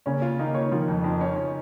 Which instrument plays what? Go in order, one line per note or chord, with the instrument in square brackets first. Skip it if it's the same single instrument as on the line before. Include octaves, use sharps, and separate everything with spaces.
[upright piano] C#3 C#4 [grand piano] A#3
[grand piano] F4
[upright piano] D#3 D#4 [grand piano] A#3
[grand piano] C#5
[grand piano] D#3 [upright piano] F3 F4
[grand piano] F2
[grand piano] F2 [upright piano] D#3 D#4
[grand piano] C#4
C#4